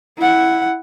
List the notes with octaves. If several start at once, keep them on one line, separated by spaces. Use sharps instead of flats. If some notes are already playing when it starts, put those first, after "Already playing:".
E4 F#5